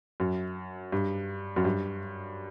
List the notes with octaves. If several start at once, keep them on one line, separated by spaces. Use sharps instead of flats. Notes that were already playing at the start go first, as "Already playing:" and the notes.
F#2
G2
F#2
G2